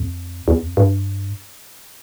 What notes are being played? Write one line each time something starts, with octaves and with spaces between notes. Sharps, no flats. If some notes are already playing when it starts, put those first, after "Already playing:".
Already playing: F2
E2
F2
G2